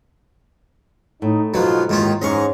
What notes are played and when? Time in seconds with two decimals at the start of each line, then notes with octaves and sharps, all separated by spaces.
1.22 A2 D#4
1.54 G#2 B2 F3 F#3 F4
1.89 D#2 G#2 D#3 C#4 F4
2.22 G#2 C#4 D#5 F5 C#6